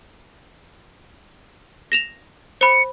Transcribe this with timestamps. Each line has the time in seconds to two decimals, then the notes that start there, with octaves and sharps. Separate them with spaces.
1.92 A#6 E7 F7
2.61 C5 B5 C#7